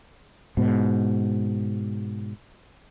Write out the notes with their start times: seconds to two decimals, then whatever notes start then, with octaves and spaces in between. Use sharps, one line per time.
0.57 G#2 B2